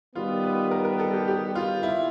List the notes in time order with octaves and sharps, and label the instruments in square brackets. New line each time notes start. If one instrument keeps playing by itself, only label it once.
[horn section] D#3 G3 B3 [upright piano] F4
[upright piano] B4
A#4
A#4
A4
G4
G4
F4
E4